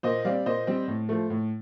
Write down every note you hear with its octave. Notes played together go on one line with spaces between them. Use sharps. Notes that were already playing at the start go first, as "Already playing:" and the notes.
A#2 C5 D#5
G3 C4 D5 F5
A#2 C5 D#5
G3 C4
A2
F3 A3
A2